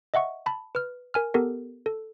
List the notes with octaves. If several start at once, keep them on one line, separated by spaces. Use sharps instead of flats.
D#5 E5 F#5 C#6
A5 B5
B4 F6
A#4 G#5 F6
B3 G4 A4 A#4
A4